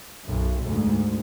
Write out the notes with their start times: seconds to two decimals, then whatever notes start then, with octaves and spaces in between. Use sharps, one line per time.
0.24 B1 F#2
0.64 D2 G#2